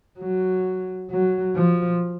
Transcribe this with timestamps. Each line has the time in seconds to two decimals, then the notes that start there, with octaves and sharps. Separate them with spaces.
0.19 F#3
1.10 F#3
1.55 F3